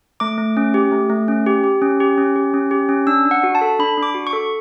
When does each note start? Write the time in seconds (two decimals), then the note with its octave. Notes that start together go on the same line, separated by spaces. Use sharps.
0.20 A3 D6
0.38 A3
0.57 C#4
0.74 G4
0.92 A3
1.10 A3
1.28 C#4
1.46 G4
1.64 G4
1.82 C#4
2.00 G4
2.18 C#4
2.36 G4
2.54 C#4
2.71 G4
2.89 C#4
3.07 D4 E6
3.25 D4
3.31 F#5
3.43 F#4
3.55 A5
3.61 A4
3.79 D4 B5
3.97 D4
4.03 D6
4.14 F#4
4.27 C#6
4.33 A4